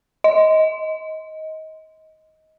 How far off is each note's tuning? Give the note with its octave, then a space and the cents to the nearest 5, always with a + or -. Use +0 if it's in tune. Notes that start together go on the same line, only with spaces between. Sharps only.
D#5 +20